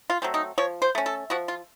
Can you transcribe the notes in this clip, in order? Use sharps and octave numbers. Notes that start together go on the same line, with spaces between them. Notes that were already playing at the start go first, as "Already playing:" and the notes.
F4
F#3 A3 C4
D#4
F3 C#5
C5
A3 C#4
A4
F3 F#4
F4